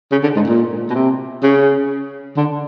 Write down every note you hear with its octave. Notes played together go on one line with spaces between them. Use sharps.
C#3
D3
G#2
A#2
B2
C3
C#3
D3